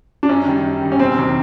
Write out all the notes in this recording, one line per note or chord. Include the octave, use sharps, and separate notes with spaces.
D4
F#2 C#4
D#3 G3
F#2
D#3 G3
C#4
E1 C4
D#2 D#3 F#3